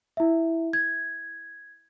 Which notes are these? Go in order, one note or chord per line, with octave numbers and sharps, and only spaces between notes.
E4 E5
G#6